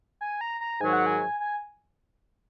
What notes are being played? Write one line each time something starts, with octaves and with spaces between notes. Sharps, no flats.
G#5
A#5
A#5
G#2 D#3 F#3 G#5
F#5
G#5
G#5